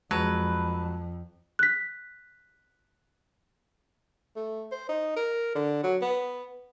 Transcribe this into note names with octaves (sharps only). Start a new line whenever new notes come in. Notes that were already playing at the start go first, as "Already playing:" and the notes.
F2 F#3 G#3 B4 A5
F#6 B6
A3
C5
D#4
A#4
D3
F#3
B3